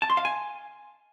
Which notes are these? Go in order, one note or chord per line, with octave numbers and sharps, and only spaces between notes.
A5
C6
F5
G#5